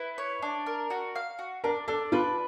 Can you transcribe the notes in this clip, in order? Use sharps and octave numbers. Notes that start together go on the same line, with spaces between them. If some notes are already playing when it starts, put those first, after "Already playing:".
Already playing: E4 B4
C#5
D4
A#4
F#4
F5
F#4
D4 A#4
D4 A4
F4 B4